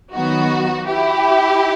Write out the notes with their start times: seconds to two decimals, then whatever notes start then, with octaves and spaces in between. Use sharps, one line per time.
0.14 D#3 F#3 B3 D#4 F#4
0.87 E4 G4